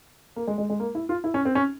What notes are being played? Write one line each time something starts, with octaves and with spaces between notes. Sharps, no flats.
A#3
G#3
G#3
G#3
A#3
E4
F4
E4
C#4
C4
C#4